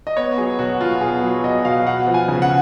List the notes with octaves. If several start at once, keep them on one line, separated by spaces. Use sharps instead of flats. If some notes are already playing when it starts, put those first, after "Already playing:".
D#5
B3 C#5
F#3 G#4
B2 F#4
B2 F4
B3 G#4
F#3
B2 D#5
B2 F5
B3 F#5
F3
G#5
C#3
F#5